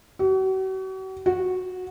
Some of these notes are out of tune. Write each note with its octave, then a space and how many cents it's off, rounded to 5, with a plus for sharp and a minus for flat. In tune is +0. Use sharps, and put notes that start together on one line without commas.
F#4 +40
F#4 -15